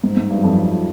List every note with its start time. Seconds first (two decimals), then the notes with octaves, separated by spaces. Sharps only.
0.04 G#2
0.17 G#2
0.31 G2
0.38 F#2
0.44 F2